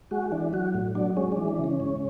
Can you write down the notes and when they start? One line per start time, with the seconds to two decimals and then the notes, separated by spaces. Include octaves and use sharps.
0.11 G#3 F#4
0.32 E3 D4
0.53 F#3 F#4
0.74 A2
0.95 F#3 D4
1.17 G#3 C#4
1.32 D4
1.37 E3
1.48 D4
1.59 C#3 C#4
1.80 G#2